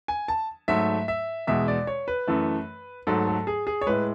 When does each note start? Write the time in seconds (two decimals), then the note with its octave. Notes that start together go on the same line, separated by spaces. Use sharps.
0.08 G#5
0.28 A5
0.68 G#2 F#3 A3 E5
1.08 E5
1.47 E2 B2 G#3 E5
1.68 D5
1.87 C#5
2.08 B4
2.28 F#2 E3 A3
3.07 G#2 F#3 A3 A4
3.27 A4
3.47 G#4
3.67 G#4
3.81 C#5
3.86 A2 G#3 B4